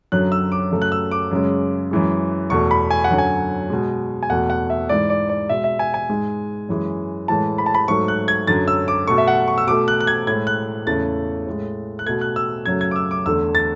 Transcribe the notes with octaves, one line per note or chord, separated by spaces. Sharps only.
F#2 D3 F#3 F#6
E6
D6
F#2 C#3 F#3 A3
F#6
E6
D6
F#2 C#3 G#3
F#2 E3 G#3
E2 B2 A3 C#6
B5
G#5
F#5
F#2 D3 F#3
G#5
B2 G#3
G#5
E2 B2 A3 F#5
F#5
E5
G#2 E3 G#3 D5
D5
D5
B2 G#3 E5
E5
G#5
G#5
G#2 G#3
F#2 E3 G#3
A2 E3 G#3 A5
B5
A5
B5
G#2 F#3 A3 C#6
F#6
G#6
F#2 D3 F#3 A6
E6
D6
B2 A3 C#6
E5
F#5
C#6
E6
B2 A3 D6
F#6
F#6
G#6
A2 G#3 G#6
F#6
E2 C#3 E3 A3 A6
A2 G#3
F#6
B2 A3 G#6
F#6
E6
F#2 C#3 F#3 A3 G#6
G#6
D6
E6
D6
E2 D3 A3 E6
A6